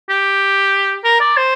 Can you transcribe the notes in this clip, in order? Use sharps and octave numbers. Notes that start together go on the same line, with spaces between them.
G4
A#4
D5
C5